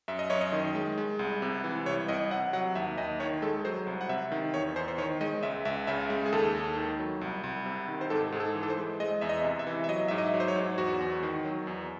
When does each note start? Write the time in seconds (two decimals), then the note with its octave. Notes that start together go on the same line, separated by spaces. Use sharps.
0.08 F#2 E5
0.19 D#5
0.30 F#2 C#5
0.41 D#5
0.53 D#3
0.75 G#3
0.98 G#3
1.19 C2
1.42 C3
1.64 E3
1.86 C2 C#5
2.08 C2 D#5
2.31 C3 F#5
2.53 F#3 F#5
2.75 D#2 E5
2.98 D#2 D#5
3.20 D#3 C#5
3.42 G#3 A4
3.65 F#3 C5
3.87 C2
4.01 F#5
4.09 C3 E5
4.32 D#3
4.54 E2 C#5
4.76 E2 C5
4.88 C5
4.98 D#3 C#5
5.21 G#3 D#5
5.43 C#2 E5
5.65 C#2 E5
5.87 C#3 E5
6.10 G#3
6.26 G#4
6.33 D#2 A4
6.55 D#2
6.77 D#3
6.99 F#3
7.21 C2
7.44 C2
7.66 C3
7.88 D#3
8.01 C5
8.10 G#2 A4
8.32 G#2 G#4
8.40 A4
8.55 E3
8.63 A4
8.70 C5
8.77 G#3
9.00 G#3 D#5
9.21 E2 E5
9.29 D#5
9.44 C3
9.59 E5
9.67 E3
9.84 E5
9.89 F#3 D#5
10.08 G#2 E5
10.18 D#5
10.34 F#3
10.40 C5
10.48 C#5
10.56 G#2
10.78 E2 F#4
11.00 E2
11.23 D#3
11.45 F#3
11.67 E2